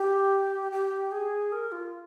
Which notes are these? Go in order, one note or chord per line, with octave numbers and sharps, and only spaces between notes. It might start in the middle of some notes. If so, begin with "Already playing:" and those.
Already playing: G4
G4
G#4
A#4
F4